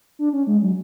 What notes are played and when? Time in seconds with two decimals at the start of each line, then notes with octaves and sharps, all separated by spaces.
0.19 D4
0.33 C#4
0.47 G#3
0.62 F#3